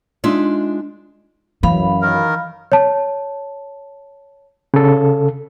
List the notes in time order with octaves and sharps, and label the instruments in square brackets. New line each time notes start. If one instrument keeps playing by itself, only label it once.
[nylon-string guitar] G#3 D4 D#4 F4 E5
[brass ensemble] F#2 [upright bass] E3 [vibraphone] F5 B5
[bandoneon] D#3 A#4
[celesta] C#5 A5
[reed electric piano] C#3 A4